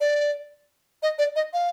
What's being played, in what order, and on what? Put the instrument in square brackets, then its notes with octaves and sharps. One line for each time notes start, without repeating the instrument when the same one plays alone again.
[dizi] D5
D#5
D5
D#5
F5